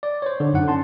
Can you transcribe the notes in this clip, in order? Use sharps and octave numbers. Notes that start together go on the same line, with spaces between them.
D5
C5 C#5
D3
F#2 D#4 F#5
C#4 A5 C6